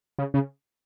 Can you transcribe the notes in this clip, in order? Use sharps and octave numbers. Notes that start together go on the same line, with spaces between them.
C#3
C#3